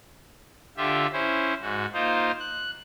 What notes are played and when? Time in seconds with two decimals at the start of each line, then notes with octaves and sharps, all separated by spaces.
0.77 D3 F4 G4 E5
1.13 C#4 E4 C5
1.61 G#2 F#4
1.93 A#3 D#4 F4 C5
2.40 F#6